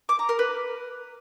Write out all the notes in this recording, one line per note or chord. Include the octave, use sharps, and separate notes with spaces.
D6
A#5
A#4
B4